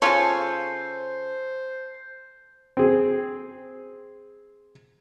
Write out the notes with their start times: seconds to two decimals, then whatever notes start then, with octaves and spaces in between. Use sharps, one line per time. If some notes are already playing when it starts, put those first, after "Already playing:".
0.02 C#3 F4 A4 C5 C#5 G#5
2.77 C4 G#4